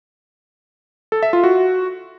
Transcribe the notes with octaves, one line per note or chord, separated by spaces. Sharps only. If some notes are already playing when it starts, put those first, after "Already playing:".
A4
E5
F4
F#4